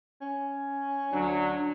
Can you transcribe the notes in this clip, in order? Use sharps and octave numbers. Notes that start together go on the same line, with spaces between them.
C#4
D2 F#3 D4